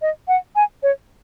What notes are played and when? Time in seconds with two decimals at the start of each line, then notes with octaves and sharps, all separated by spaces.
0.02 D#5
0.28 F#5
0.56 G#5
0.83 C#5